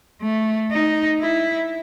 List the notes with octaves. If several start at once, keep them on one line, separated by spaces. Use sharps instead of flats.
A3
D#4
E4